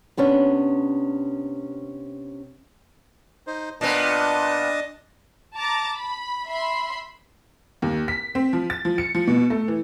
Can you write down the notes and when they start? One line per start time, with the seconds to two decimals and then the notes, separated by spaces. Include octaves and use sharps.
0.17 C3 B3 C#4 D4
3.47 D#4 C5
3.81 A#2 B3 D4 D#5 A5
5.57 A5 A#5 D6 A6
5.94 B5
6.49 E5 B5 C6
7.82 D#2
8.08 B6
8.35 C4
8.53 F3
8.70 A6
8.85 F3
8.98 C#7
9.15 F3
9.28 B2
9.50 A3
9.68 E3